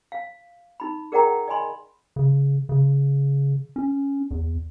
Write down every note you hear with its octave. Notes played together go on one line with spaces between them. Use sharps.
F5
D#4 B5
G#4 A#4 D5 F#5 G5 A#5
D5 D#5 G#5 B5 C6
C#3
C#3
C#4
E2